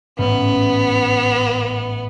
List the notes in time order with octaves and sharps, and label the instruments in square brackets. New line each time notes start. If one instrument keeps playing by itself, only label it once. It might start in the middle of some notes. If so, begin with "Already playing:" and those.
[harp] A1 G#2 C#4 [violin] B3